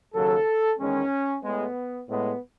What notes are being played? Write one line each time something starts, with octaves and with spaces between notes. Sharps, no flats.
D#2 C#3 F#3 A4
E2 D#3 G#3 C#4
A2 G#3 B3
A2 G#3 B3